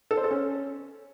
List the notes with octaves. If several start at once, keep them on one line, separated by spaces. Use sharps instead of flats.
A4
C5
A4
C#4